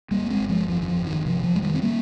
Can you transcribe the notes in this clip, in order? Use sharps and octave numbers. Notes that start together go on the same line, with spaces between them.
G1 G3 A#3
A#3
G#3 C4
G1
F3 G#3
F2 F3
D#3
F3
G1
D#3
C3 F3
F3
F2 G#3
D#3 G3
C4
G3 A#3